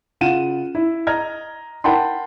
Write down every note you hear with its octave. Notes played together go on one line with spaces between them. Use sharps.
C#3 F4 F#5 D#7 E7
E4
D#5 A#5 F6 G#6
A#4 F#5 G5 A5 B5 C6